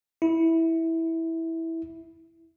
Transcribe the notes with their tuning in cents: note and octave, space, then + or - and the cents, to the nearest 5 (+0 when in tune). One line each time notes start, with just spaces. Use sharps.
E4 -10